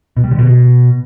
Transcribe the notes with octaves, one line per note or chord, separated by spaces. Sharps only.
B2
G3
D3
B2